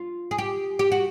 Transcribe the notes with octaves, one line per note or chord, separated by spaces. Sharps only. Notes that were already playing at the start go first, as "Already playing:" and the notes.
Already playing: F4
G#4
G4
G4
F#4